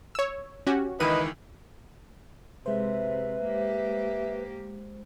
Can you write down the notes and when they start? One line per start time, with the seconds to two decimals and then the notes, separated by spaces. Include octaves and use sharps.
0.15 C#5 E6
0.67 C#4 F#4 G4
1.00 C#2 D#3 E3 E4 B4 D#5 D#7
2.66 C3 G#3 B4 C5 E5
3.44 A#3 G4